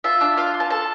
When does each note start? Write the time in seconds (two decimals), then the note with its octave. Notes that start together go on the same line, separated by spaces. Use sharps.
0.04 F4 E5
0.21 D4
0.37 F4 F5
0.54 F4
0.60 A5
0.70 A4 A5